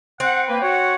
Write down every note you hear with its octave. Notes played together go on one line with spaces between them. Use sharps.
C4 F#5
A#3 B4
F#4 C#5 F#5